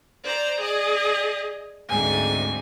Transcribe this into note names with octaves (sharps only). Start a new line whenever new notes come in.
C5 D5 A#5
G#4 D5 D#5
D2 G#2 C3 G#5